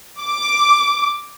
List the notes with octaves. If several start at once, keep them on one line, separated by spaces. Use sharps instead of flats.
D6